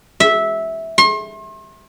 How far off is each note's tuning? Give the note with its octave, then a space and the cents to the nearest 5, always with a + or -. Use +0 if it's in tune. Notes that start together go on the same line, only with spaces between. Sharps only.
E5 -10
C6 +40